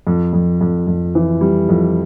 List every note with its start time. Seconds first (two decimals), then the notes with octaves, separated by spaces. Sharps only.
0.07 F2
0.33 F2
0.61 F2
0.87 F2
1.15 E3
1.41 G3
1.69 F2